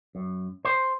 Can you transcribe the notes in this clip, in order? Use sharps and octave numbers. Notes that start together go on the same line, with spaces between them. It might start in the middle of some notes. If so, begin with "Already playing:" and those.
F#2
C5